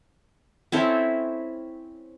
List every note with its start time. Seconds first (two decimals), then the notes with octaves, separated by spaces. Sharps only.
0.72 C4 C#4 E4 A4